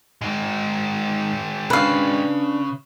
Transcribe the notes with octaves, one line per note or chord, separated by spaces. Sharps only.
G#2 G#3 C4
C#3 D4 B4 F5